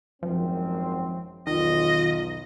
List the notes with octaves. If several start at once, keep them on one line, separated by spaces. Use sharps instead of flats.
G#1 F#2 F3 C4
B1 E2 D#3 F4 D#5